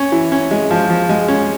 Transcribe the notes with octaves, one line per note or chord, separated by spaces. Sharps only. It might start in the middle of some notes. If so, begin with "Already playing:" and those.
Already playing: C#4
E3
C#4
G#3
F3
F3
G#3
C#4